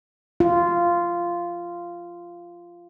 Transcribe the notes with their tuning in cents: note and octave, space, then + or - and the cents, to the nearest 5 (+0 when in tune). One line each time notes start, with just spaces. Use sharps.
F4 -10